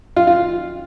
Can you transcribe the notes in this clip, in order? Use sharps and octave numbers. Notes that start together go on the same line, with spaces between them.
F4
F4